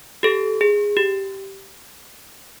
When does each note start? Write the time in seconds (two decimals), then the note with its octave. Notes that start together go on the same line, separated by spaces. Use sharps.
0.23 G4 A4
0.61 G#4
0.97 G4